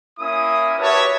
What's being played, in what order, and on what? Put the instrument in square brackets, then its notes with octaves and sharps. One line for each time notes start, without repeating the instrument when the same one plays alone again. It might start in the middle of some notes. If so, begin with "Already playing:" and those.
[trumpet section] A#3 C#4 E4 D#6
F#4 G4 B4 C#5 E5 A5